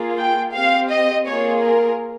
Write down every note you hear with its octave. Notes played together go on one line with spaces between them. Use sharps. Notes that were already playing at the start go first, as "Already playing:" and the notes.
Already playing: A#3 F4 G#4
G5
C4 G4 F5
D#5
A#3 F4 G#4 C#5
A#4